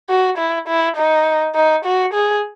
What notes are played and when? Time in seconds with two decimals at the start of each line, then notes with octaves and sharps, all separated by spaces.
0.09 F#4
0.38 E4
0.68 E4
0.96 D#4
1.55 D#4
1.85 F#4
2.14 G#4